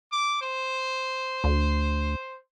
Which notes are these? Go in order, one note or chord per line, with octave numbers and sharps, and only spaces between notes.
D6
C5
D2